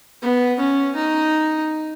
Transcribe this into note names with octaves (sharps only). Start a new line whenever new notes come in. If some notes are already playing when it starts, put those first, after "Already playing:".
B3
C#4
D#4